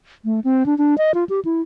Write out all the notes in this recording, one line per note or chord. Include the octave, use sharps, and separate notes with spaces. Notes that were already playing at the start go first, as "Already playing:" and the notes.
A3
C4
D4
D4
D#5
F4
G4
E4